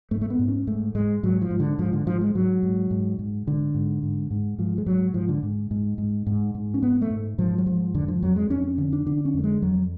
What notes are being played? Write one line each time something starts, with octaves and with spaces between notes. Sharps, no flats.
G#2 A3
A3
B3
G#2
C#4
G#2 A3
G#2 G#3
G#2 F#3
F3
G#2
D3
G#2 F3
D3
G#2 F3
G#3
G#2 F#3
G#2
G#2
G#2
G#2 D3
G#2
G#2
G#2
G#2 F3
G#3
G#2 F#3
G#2 F3
D3
G#2
G#2
G#2
G#2
G#2
C#4
G#2 B3
A3
G#2
G#2 F3
F#3
G#2 F3
F2 D3
F3
F2 F#3
G#3
F2 C#4
C#4
D3 C#4
D4
D3 D4
C#4
F2
A3
G#3
F2 F#3